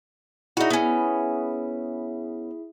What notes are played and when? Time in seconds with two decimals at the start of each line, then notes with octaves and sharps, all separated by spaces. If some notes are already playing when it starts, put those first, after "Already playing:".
0.57 D#4 E4 F#4 G#4 E5
0.70 B3 C#4